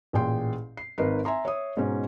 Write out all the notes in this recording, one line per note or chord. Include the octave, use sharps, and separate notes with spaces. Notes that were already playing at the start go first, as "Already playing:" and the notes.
A1 A#2 G#4 G5 C6
C7
G#1 D#4 A#4 B4 C7
E5 G#5 A#5 C6
C#5 E5 D#6
G#2 B2 C#4 D#4